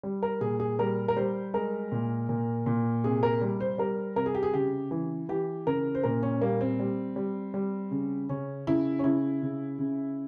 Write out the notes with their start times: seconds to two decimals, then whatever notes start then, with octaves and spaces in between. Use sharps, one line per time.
0.03 G3
0.23 A#4
0.41 A#2 G#4
0.60 G#4
0.79 G3 A#4
1.08 A#4
1.16 G3 C5
1.54 G#3 A#4
1.92 A#2
2.29 A#2
2.66 A#2
3.04 C3 G#4
3.23 A#4
3.41 G3
3.60 C5
3.78 G3 A#4
4.16 C3 A#4
4.26 G#4
4.35 G4
4.43 G#4
4.54 C#3 G4
4.91 E3
5.29 E3 G4
5.66 C#3 A#4
5.95 C5
6.03 A#2 A#4
6.23 C#4
6.41 G3 A#3
6.61 C4
6.79 G3
7.16 G3
7.54 G3
7.91 C#3
8.29 C#3 C#4
8.67 C#3 E4
8.99 C#4
9.04 C#3 E4
9.42 C#3
9.79 C#3